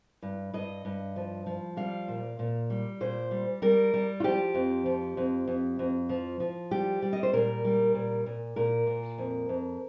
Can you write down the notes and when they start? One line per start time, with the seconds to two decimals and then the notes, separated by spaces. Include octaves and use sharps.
0.23 G2
0.54 G2 D#5
0.85 G2
1.16 F3
1.46 F3
1.77 G3 F5
2.08 A#2
2.39 A#2
2.70 G3
3.01 A#2 C5
3.31 G3
3.62 G3 A#4
3.94 G3
4.20 F4
4.24 F3 G4
4.55 F2
4.86 F3
5.17 F2
5.48 F2
5.79 F2
6.09 F3
6.40 F3
6.71 G3 G4
7.02 G3
7.13 D#5
7.23 C5
7.33 A#2 A#4
7.65 G3
7.95 A#2
8.26 A#2
8.56 A#2 A#4
8.87 A#2
9.18 F2
9.49 F2